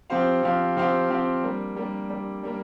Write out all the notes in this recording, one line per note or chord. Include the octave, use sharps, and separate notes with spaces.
F3 C4 G4 C5 F5
F3 C4 G4 C5 F5
F3 C4 G4 C5 F5
F3 C4 G4 C5 F5
G3 A#3 D4
G3 A#3 D4
G3 A#3 D4
G3 A#3 D4